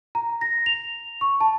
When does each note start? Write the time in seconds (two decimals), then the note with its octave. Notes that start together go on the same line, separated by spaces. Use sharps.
0.15 A#5
0.41 A#6
0.66 F7
1.21 C#6
1.41 A5